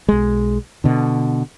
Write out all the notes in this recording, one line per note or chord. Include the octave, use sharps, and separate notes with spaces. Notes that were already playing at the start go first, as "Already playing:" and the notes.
B1 G#3
B2 D3